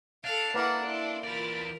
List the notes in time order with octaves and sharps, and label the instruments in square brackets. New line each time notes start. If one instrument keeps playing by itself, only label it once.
[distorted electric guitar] D4 [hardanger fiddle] A4 F5
[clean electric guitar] A#3 [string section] E4 [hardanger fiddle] B4 F#5
[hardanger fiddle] E4 [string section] D5 A5 C6
[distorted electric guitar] E3 D5 [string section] F4 B5 A6 [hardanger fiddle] A#4